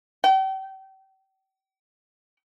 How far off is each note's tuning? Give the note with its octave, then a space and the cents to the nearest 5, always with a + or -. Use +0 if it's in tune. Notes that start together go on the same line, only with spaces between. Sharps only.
G5 -35